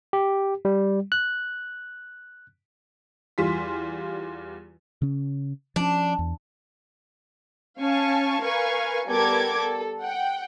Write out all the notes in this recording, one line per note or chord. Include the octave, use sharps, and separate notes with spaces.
G4
G3
F#6
E2 G3 F4 C6 B6
C#3 C#4
F3 C#4 D4
E2
C#4 F5 G#5 A5 C#6
A#4 B4 F5 G#5 C#6 G#6
G3 B3 A4 A#4 D6 G#6
A4
F#5 G5